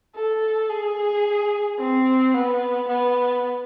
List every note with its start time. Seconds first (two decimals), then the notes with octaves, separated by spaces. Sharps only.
0.15 A4
0.70 G#4
1.79 C4
2.34 B3
2.88 B3